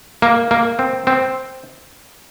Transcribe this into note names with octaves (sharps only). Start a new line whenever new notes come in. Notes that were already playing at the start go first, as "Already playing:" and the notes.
A#3
A#3
C4
C4